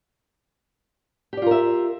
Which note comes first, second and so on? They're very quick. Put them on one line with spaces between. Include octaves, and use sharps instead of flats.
G4 D5 F4 A#4 E5